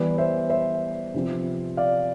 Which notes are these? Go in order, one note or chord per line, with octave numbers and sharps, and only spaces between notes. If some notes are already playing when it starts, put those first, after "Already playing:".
Already playing: E3 G3 B3 B4 D5
C5 E5
C5 E5
C3 F3 C4
D5 F5